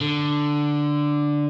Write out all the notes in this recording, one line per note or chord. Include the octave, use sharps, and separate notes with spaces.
D3